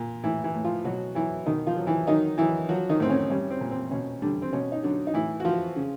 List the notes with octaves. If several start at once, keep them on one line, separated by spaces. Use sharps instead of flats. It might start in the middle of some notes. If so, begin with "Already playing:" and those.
Already playing: A#2
A2 E3 E4
E3 E4
A2
F3 F4
B2 F#3 F#4
E3 F#3 E4
B2 D#3 D#4
F3 F4
F#3
E3 E4
D#3 F#3 D#4
E3 F#3 E4
F3 F#3 F#4
D#3 D#4
A2 C4
C#4
G3 C#4
C4
A#2
C4
B2 C#4
D3 G3 D4
C4
B2 C#4
D#4
D3 F#3 D4
D#4
A2 E3 E4
F#4
F3 F4
C#3